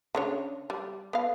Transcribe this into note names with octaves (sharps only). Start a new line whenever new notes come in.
C#3 D4 C#5
G3
B3 F5